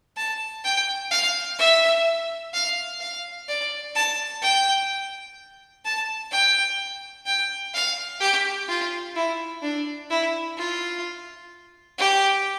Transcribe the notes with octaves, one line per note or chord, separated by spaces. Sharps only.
A5
G5
F5
E5
F5
F5
D5
A5
G5
A5
G5
G5
F5
G4
F4
E4
D4
E4
F4
G4